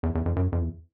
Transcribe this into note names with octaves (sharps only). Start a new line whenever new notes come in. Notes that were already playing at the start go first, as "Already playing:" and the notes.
E2
E2
F2
F#2
F2
E2